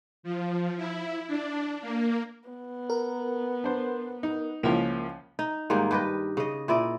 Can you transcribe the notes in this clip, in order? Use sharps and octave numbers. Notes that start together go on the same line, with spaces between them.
F3
E4
D4
A#3
B3
A#4
D4 C5
D#4
C#2 F3 A#3 C#4 E4
D#4
G#2 D#3 G3 A#3
G2 G4 B4 D#5
C#3 D#5
A#2 E4 D5 D#5